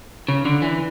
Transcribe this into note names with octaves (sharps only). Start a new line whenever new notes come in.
C#3
D3
E3